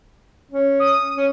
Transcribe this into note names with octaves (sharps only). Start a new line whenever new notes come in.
C#4
D#6
C#4